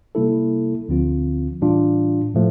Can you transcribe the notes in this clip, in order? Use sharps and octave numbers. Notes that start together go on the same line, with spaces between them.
C3 G3 A#3 E4 A4
D2 D3 F3 C4 F4
A2 E3 G3 D4 F4
A2 F3 A3